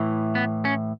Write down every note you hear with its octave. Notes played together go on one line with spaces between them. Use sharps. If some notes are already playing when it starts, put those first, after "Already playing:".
Already playing: A2 E3
B3
C#4